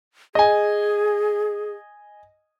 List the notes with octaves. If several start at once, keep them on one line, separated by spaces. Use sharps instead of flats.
G#4 D#5 G#5